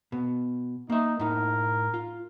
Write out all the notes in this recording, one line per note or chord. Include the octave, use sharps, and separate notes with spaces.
B2
A#3 D#4 E5
A2 D#4 A#4
F4